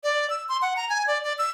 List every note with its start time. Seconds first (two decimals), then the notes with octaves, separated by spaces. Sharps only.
0.04 D5
0.30 E6
0.49 C6
0.62 F#5
0.76 A#5
0.89 G#5
1.07 D5
1.23 D5
1.39 E6